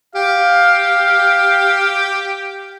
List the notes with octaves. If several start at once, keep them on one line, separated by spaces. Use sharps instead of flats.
G4 F5